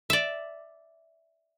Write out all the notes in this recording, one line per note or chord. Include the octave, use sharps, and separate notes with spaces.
D5 E5